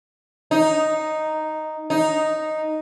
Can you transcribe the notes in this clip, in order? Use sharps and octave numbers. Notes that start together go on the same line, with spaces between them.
D#4
D#4